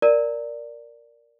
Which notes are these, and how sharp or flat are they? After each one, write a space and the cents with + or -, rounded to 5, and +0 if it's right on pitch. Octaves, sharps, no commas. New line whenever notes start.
A#4 +0 D5 +0 A#5 -30